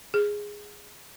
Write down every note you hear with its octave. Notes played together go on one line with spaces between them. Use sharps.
G#4